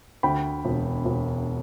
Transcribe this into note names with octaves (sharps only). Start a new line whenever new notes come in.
D2 G5 B5
E1
E1